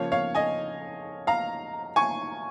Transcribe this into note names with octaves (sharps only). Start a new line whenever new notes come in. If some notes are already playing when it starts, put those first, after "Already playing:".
Already playing: C#3 F3 A#3 C#5 F5
C#5 F5
D#5 G#5
F5 A#5
G#5 C#6